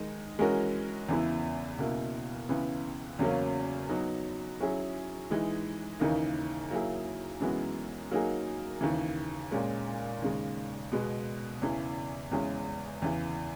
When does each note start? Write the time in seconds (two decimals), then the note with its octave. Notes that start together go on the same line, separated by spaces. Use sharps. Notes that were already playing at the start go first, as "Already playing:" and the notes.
Already playing: D#3 G#3 D#4
0.39 E3 G#3 C#4 F#4 A#4
1.09 E2 C#3 E3 B3 E4
1.79 C#2 B2 A#3 E4
2.49 C#2 C#3 E3 B3
3.19 E2 C#3 F#3 A#3 C#4
3.89 F#3 B3 D#4
4.60 F#3 C#4 E4 G#4
5.30 E3 G#3 D#4
6.00 D#2 C#3 E3 A#3 D#4
6.71 F#3 A#3 E4 G#4
7.40 F#2 E3 G#3 B3 F#4
8.11 F#3 A#3 D#4 G#4
8.81 D#2 C#3 E3
9.51 A#2 G#3 C#4
10.22 D#2 C#3 G#3
10.92 B2 G#3 B3
11.62 E2 C#3 E3
12.32 E2 C#3 E3 G#3 C#4
13.02 E2 C#3 E3